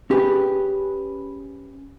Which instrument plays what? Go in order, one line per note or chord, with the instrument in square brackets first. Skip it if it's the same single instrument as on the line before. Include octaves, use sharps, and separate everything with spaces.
[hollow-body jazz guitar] C#4 G4 G#4 B4